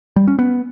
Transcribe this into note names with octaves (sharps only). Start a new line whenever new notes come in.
G3
C#4
B3